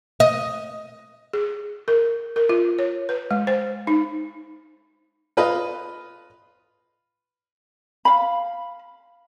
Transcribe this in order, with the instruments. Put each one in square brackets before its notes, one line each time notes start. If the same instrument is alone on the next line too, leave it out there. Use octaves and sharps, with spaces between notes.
[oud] D#5
[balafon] G#4
A#4
A#4
F4
C#5
B4
G#3
C5
D#4
[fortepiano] F4 B4 D#5
[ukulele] F5 B5